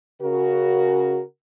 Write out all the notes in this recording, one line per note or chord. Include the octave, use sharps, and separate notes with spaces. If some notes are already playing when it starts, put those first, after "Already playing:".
C#3 F#4 A#4